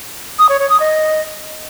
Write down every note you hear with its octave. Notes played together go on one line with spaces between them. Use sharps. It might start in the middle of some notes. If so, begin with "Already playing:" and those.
D#6
C#5
C#5
D#6
D#5